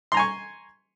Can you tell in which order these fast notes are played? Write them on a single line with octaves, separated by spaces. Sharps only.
C6 A#5 G#5 C#6